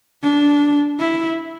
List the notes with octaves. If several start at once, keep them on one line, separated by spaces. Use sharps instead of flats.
D4
E4